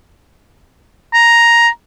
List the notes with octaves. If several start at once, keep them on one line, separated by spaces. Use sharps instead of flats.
A#5